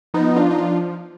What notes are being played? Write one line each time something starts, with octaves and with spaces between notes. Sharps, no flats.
F3 B3 D#4
D4 F4
F3
D#4
D4 F4